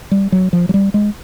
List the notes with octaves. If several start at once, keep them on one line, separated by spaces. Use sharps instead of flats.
G3
F#3
F3
F#3
G3
G#3